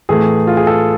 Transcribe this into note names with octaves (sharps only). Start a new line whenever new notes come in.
A2 E3 A3 G#4
F4
G#4
A4